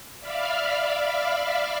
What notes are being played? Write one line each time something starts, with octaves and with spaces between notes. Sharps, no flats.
D5 E5 F5 B5 F6